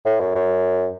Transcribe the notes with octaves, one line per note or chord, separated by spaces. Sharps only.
A2
F#2
F#2